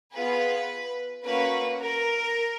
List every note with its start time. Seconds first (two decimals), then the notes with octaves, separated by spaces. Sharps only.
0.13 B3 F4 G#4 B4
1.24 A#3 C#4 F#4 B4
1.81 A#4